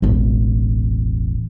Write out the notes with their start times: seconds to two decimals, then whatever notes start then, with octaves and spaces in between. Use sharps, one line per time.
0.02 E1 A1